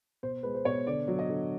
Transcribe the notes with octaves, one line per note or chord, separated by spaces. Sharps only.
B2 C5
G#3 B4
C5
B2 C#5
D3 D5
F#3
D#5
D3